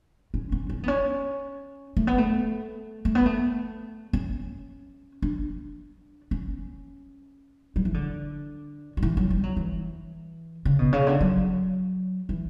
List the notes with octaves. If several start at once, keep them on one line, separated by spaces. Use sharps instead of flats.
C#4
C#4
C#4
B3
C#4
A3
B3
A3
A3
B3
A3
C#4
D4
C#4
F#3
E3
D3
F#3
E3
F#3
G3
F#3
E3
C#3
B2
C#3
D3
F#3
E3